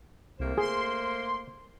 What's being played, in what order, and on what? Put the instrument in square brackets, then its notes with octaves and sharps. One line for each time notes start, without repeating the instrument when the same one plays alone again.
[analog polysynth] C2 [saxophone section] A3 A#3 C5
[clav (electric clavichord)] G#4 [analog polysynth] C6